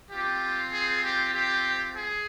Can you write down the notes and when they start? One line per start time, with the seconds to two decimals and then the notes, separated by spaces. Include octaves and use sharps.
0.11 C4 F4 G4
0.72 G#4
1.03 G4
1.34 G4
1.96 G#4